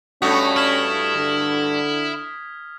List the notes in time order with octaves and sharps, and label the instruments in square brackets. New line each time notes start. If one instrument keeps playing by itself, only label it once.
[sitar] G2 A3 F#4 [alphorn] C#4 [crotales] D#6 B6
[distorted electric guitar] E4 [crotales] F6 G#6 B6
[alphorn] D3